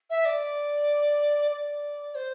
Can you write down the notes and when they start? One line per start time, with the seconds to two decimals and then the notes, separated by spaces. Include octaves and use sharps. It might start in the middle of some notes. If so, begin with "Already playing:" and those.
0.10 E5
0.25 D5
1.51 D5
2.14 C5